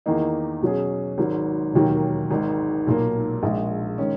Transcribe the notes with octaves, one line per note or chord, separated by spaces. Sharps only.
E2 D#3 A#3 D#4
B2 F#3 C#4 G#4
G#1 G#2 F#3
E1 D#2 D#3 F#3 A#3
G#1 G#2 D#3 G#3
B1 A#2 A#3
A#1 A#2 G#3
D#3 G#3 C#4